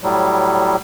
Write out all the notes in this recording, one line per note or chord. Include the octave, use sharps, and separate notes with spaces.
A2 F#3 G3